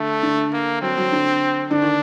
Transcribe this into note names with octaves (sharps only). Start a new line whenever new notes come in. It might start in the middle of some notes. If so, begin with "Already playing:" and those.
Already playing: D3 A3
D3
A#3
F#3 C4
F#3
D3
D3 D4
D#3